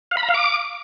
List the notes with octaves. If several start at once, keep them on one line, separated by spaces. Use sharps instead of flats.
F5
B5
A#5
F5
D6